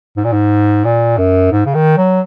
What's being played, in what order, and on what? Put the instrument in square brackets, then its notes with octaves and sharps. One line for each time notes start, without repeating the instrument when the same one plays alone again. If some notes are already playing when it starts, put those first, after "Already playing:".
[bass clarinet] G#2
A#2
G#2
A#2
F#2
G#2
C#3
D#3
F#3